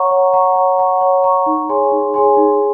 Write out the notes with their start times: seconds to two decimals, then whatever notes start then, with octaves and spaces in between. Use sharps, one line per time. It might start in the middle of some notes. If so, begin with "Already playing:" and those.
Already playing: C#5 F#5 A#5 C#6
0.11 C#5
0.33 F#5 A#5 C#6
0.56 C#5
0.78 F#5 A#5 C#6
1.01 C#5
1.24 F#5 A#5 C#6
1.46 D#4
1.69 G#4 C#5 G#5 C6
1.92 D#4
2.14 G#4 C#5 G#5 C6
2.37 D#4